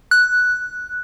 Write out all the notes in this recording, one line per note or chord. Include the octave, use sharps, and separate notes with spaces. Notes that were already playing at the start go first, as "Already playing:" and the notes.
F#6